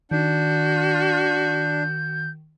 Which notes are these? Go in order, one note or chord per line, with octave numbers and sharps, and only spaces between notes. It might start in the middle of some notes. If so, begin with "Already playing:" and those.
D#3 D4 F#4 G6